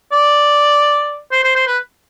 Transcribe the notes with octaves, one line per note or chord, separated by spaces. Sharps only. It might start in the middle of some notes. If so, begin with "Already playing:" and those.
D5
C5
C5
C5
B4